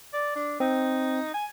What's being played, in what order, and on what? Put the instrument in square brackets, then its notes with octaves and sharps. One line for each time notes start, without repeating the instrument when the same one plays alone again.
[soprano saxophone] D5
D4
[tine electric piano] C4 [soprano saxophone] D#4
[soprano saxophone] G#5